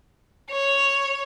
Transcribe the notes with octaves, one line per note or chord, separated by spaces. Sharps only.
C#5